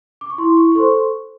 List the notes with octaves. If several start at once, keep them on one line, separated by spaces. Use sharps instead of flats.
D6
C#6
E4 C6
C#6
C6
A4 C5 C#6